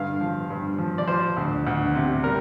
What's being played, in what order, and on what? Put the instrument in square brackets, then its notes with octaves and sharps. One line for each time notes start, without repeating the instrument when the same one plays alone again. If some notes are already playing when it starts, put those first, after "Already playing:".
Already playing: [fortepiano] G2 D3 F5
F3
G2
F3
D5
F3 C5
D2
D2
C3
G3 A#4